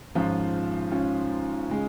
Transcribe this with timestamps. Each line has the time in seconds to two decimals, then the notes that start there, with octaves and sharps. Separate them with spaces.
0.15 G#1 G#2 F3 C#4 F4
0.92 C#4 F4
1.69 C#3 G#3